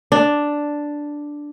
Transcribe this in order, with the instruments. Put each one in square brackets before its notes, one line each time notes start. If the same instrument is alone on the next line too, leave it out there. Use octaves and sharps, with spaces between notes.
[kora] D4